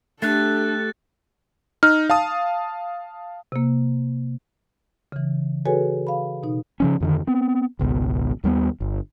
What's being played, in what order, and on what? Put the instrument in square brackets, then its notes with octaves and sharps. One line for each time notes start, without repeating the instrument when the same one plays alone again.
[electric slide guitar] A3 [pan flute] D4 [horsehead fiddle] G4 A4 [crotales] F#6 A6
[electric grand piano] D#4 [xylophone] F6
[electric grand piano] F5 A5 D#6
[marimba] C3 A#3
C#3 E3
F#4 G#4 A4 B4 C#5 G#5
F5 B5
B2 D#4
[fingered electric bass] C#3 F3 C#4
F2 D3 D#3
B3 C4
G#1 C#2 B2
D#2 G3 G#3 B3
G1